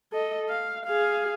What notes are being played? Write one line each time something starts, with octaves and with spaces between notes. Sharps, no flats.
A4 D#5
F5
G#4 F5